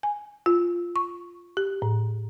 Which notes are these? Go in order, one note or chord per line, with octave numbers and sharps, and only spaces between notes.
G#5
F4
C#6
G4
A2